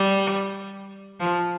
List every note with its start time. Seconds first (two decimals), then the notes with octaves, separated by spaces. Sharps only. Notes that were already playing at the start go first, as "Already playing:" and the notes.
Already playing: G3
1.20 F3